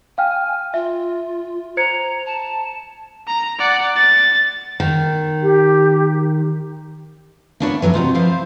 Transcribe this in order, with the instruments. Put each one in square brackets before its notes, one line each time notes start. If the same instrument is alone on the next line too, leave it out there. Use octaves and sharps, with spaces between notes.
[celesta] F5 G5 F6 [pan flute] G#5
[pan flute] F4 [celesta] E5
[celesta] C5 G#6 C#7 [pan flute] A#5
[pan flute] A5
[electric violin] A#5
D5 F#5
A6
[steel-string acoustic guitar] D#3
[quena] G4
[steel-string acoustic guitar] A#3 B3 D4 E4 C#5
E3 F#3 D4 A#4
C3 F#3 D#4 F4
F3 E4 C5 F5